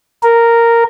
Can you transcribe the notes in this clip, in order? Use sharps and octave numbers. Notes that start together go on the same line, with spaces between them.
A#4